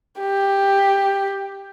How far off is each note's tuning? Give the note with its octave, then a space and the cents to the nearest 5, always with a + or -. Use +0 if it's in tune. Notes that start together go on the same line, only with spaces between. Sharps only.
G4 +10